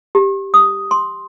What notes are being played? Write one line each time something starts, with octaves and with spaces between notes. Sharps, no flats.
G4
D#6
C6